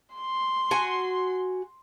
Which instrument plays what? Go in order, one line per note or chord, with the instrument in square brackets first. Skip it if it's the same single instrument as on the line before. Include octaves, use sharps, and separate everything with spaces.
[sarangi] C6
[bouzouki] F#4 G#5